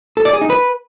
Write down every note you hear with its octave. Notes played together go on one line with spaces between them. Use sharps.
A4
D5
G#4
D#4
B4